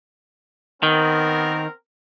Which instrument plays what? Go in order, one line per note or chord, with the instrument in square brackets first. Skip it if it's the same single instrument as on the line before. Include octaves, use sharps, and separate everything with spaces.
[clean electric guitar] D#3 [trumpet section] B3 C4 A#4